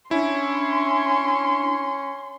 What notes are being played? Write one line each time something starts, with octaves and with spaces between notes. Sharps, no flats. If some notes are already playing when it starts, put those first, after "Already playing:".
C#4 D4 E4 C6